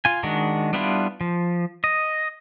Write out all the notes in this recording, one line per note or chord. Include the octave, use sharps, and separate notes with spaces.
F4 G#5
D#3 G#3 D4 F#4
G3 B3 D4 E4 F4
F3
D#5